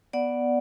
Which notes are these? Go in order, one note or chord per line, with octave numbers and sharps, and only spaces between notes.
B3 D5 F#5